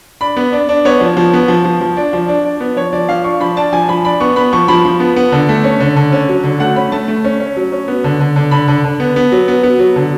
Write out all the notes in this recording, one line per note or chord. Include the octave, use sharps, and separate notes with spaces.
D4 B5
B3
D4
D4
B3 C#5
F3
F3
B3
F3
F3
F3
D4
F3
D4
D4
B3
F3 C#5
F3 D5
F3 F5
D4 C#6
F3 B5
D4 A5
F3 G#5
F3 B5
D4 B5
B3 C#6
B3 B5
F3 C#6
F3 B5
F3
B3
B3
D3
A3
C#4
D3
D3
C#4
F#3
D3
A3 F#5
C#4 B5
A3 A5
A3
C#4
C#4
F#3
C#4
B3
D3
D3
D3
D3 B5
D3
D3
B3
B3
F#3
B3
B3
F#3
D3